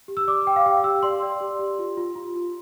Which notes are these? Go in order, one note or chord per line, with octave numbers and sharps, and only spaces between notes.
G4
E6
D5 D6
G4 G5
F5
G4 G5
G4 E6
D5 C6
D5
G4
G4
F4
F4
F4
F4